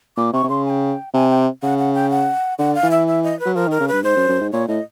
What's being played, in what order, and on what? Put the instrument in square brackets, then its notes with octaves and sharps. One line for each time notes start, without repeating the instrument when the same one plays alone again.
[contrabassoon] A#2 [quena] D6
[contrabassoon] C3 [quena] C#6
[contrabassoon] C3
[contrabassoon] C#3 [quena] C6
[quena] G#5
G5
[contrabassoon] C3 [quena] G#5
[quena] G5
[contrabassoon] C#3 [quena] F#5
[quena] F#5
G5
F#5
[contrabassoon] D3 [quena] F#5
[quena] F5
[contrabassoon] E3
[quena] E5
E5
D#5
B4
[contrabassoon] F#3
[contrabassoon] F3 [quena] A#4
[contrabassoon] D#3
[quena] A#4
[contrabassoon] C#3
[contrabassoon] G2 [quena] B4
[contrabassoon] G#2 [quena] C5
[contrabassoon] F#2
F#2
G#2
[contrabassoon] A#2 [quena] C#5
[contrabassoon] A2 [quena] D#5